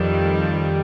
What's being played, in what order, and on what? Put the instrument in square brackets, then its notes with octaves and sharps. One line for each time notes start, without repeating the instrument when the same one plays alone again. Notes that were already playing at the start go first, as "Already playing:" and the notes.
Already playing: [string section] F2 D#3 G3